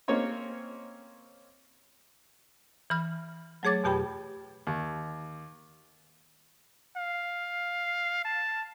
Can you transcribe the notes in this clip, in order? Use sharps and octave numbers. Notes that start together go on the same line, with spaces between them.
A#3 C4 C#4 C#5 D#5
E3 B5 F6
F#3 A3 G#4 C#5 D6 A6
F2 B2 G4 G5 B5
D#2
F5
A5